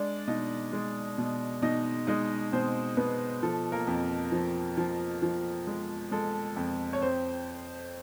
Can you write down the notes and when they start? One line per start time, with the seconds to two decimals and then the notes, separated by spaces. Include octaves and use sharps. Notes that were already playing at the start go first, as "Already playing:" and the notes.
Already playing: G#3 D4 D5
0.27 B2 D#4 D#5
0.73 G#3
1.18 B2
1.62 B2 D#4 D#5
2.07 G#3 D#4 D#5
2.52 B2 C4 C5
2.97 B2 B3 B4
3.43 F3 A4
3.72 A#3 A#4
3.87 F2
4.32 F3
4.77 F3
5.22 F3
5.67 G#3
6.12 G#3 A4
6.56 F2
6.93 C#5
7.01 C4 C5